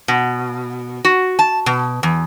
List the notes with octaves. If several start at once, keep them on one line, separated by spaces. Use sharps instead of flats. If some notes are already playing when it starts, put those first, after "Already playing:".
B2
F#4
A5
B2
E2